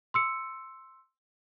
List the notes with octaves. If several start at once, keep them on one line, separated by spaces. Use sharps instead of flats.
C6 E6 C#7